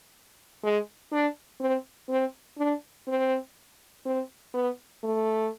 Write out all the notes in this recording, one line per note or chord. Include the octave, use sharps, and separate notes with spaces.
G#3
D4
C4
C4
D4
C4
C4
B3
A3